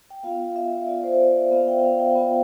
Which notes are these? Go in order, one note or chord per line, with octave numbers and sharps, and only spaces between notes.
G5
B3 F4 F5
E5
B3 F4 D5
C5
D5
B3 F4 F5
G5
F5
G5
B3 F4